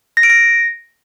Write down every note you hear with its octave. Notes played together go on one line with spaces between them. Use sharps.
A#6
D7
A#6